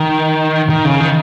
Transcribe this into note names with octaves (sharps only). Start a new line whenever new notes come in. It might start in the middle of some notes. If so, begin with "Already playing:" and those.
Already playing: D#3
D#3
C#3
D#3